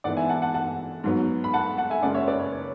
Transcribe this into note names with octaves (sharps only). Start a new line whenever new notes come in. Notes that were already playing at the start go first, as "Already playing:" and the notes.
G#2 E3 B3 D5 F#5
E5 G#5
F#5 A5
F#5 A5
F#5 A5
G#2 F#3 B3
B5
F#5 A5
F#5 A5
E5 G#5
F#1 F#2 C#3 G#3 D5 F#5
C#5 E5
B4 D5
C#5
C#5